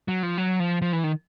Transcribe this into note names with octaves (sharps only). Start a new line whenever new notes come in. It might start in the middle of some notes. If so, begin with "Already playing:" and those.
F#3
F3
F#3
F3
F3
E3
D#3